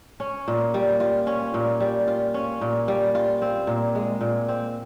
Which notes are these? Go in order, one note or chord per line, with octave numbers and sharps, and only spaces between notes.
C#4
A#2
G3
F4
C#4
A#2
G3
F4
C#4
A#2
G3
F4
C4
A#2
G#3
A#2
C4